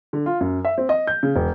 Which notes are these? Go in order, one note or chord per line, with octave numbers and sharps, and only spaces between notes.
D3
F4
F#2
E5
C4
D#5
G6
C#3
E1